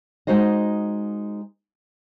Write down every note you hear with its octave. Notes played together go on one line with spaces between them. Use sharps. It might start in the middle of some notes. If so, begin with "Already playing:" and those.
G#3 D#4 F#4 C5 D#5